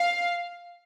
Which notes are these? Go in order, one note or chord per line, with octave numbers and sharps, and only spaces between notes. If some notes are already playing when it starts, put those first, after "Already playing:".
Already playing: F5